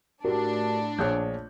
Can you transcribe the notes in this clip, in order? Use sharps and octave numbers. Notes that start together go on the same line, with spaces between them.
A2 D4 F#4 G4 A#4
A#1 G#4 C#5 F#6 G6